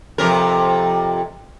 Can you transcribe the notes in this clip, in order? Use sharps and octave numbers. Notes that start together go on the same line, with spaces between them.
F2 C3 A#4